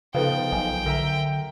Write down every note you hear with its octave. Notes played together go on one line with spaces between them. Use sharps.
C#3 F3 B3 D#4 A4 B4 F5 G5
B1 F#3 G#5
D3 A#4 E5 A#5